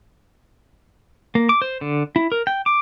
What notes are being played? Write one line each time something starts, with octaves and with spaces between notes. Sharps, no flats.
A#3
D6
C5
D3
E4
A#4
G5
D6